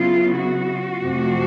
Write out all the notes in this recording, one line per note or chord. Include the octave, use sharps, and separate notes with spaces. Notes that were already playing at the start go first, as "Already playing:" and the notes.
Already playing: C#3 F#3 B3 E4 F4
F#4
F2 C3 F3 A3 C4